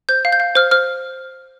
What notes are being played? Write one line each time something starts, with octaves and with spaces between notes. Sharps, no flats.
C5 G6
F5
G6
F5
C5 F6
C5 F6